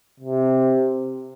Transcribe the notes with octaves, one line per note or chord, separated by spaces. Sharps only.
C3